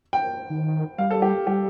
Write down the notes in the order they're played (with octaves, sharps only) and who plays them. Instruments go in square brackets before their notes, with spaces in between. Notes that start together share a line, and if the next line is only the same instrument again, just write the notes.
[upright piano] G5
[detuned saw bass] D#3
[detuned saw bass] G3 [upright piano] F5
[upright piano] A4
G4
[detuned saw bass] G3 [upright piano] G4